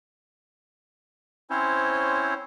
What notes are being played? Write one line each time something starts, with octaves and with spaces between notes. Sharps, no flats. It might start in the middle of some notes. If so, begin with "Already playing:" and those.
C4 C#4 E4 C5 C#5